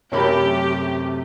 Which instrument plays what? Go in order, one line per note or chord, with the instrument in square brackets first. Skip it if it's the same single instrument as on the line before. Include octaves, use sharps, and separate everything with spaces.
[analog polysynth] F#2 C3 A3 [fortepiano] C#4 A#4 B5 [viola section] G4